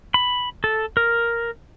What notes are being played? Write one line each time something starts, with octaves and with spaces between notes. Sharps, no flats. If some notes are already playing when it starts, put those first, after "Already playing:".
B5
A4
A#4